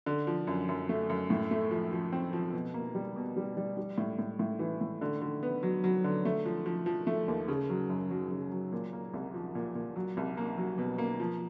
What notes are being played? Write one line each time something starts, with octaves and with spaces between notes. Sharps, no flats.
D3
F3
F#2
F#2
A3
F#2
A2
A3
F3
F3
C4
F3
B2
A#3
G3
B2
G3
G3
G3
A2
A2
A2
E3
A2
D3
D3
B3
F#3
F#3
D3
A3
F3
F3
F3
A3
D#2
C#3
F#3
F#2
F#3
C#3
F#3
A#2
A#3
C2
F3
A#2
A#2
F#3
C2
A#3
F#3
B2
A#3
F3